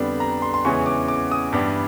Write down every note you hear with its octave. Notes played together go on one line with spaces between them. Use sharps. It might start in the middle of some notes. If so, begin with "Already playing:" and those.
Already playing: F2 D3 G3 B3 D4
A#5
C6
C6
E2 C#3 E3 G#3 C#4 C#6
D6
D6
D#6
G2 E3 G3 B3 D4